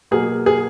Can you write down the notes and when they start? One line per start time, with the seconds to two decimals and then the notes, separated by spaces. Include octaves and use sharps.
0.11 B2 F#3 A#3 G#4
0.46 G#4